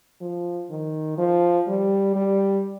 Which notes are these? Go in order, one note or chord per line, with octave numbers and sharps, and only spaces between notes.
F3
D#3
F3
G3
G3